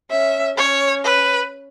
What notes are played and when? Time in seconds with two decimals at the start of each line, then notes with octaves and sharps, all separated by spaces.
0.11 C#4 E5
0.57 C#4 C#5
1.04 B4